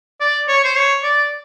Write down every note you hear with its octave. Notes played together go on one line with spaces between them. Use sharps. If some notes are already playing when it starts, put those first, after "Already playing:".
D5
C#5
C5
C#5
D5